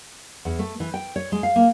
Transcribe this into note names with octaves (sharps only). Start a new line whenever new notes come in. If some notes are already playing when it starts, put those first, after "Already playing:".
E2
A3
E3
G5
C#5
G#3
F5
A#3